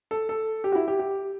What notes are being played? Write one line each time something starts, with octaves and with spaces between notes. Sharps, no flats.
A4
A4
G4
F#4
E4
G4
G4